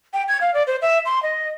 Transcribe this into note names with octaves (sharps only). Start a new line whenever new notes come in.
G5
G#6
F5
D5
C5
E5
C6
D#5